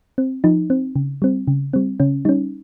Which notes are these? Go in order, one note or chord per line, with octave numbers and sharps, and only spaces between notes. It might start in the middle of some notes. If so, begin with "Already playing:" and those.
C4
F3 D#4
C4
C#3
G3 C4
C#3
G3 C4
C#3 C#4
G3 C#4 D#4